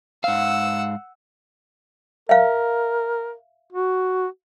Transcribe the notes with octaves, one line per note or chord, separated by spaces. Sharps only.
G#2 F5 F#5 E6
A#4 E5 F5
F#4